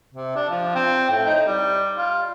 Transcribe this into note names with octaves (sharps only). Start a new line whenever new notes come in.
C3
D4
F3
C4
A2
D#4
G3
F4